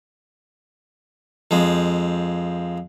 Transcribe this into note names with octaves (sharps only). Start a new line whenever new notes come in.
F2 F3 G#3